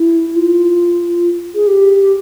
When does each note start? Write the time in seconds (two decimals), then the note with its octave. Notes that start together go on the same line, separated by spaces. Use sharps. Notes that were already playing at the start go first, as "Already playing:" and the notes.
Already playing: E4
0.36 F4
1.55 G#4
1.67 G4